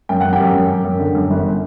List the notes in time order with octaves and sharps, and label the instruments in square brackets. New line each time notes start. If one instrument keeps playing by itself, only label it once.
[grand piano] F#2 G5
F#2 F#5
G4 G5
F#2
F#2
F#2
F#2
D3
F#2
G1